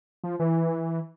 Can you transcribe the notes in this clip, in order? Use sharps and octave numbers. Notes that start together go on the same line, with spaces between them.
F3
E3